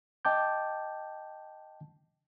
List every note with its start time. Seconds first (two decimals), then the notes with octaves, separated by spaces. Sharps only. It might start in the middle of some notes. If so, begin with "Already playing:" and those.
0.25 D#5 G5 A5 D6 G6